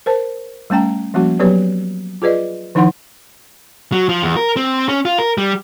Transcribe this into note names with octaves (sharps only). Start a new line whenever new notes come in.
A#4 C5 A5
G3 A3 C#4 G5 A#5
F3 G3 A#3 C#4 F#4
F#3 B3 G4 B4 C#5
F4 G#4 B4 D5 D#5
D#3 F3 D#4 E4 F#5 C6
F#3
F3
E2
A#4
C4
C#4
F4
A#4
G3